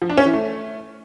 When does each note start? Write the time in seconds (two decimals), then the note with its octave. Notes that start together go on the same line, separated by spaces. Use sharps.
0.02 F3
0.10 D4
0.17 C#4
0.25 E3
0.33 A3